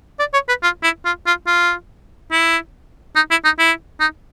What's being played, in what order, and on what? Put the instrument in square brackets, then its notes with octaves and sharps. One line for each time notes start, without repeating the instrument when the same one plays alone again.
[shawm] D5
C#5
B4
F4
E4
F4
F4
F4
E4
D#4
E4
D#4
E4
D#4